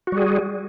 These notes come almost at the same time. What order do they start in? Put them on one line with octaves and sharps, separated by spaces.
F#4 G3 G#4